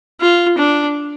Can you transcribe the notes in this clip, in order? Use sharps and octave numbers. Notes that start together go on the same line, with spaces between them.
F4
D4